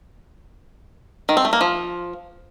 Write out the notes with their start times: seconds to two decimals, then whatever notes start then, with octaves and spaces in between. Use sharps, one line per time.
1.29 D#3
1.37 C4
1.45 A3
1.53 A#3
1.61 F3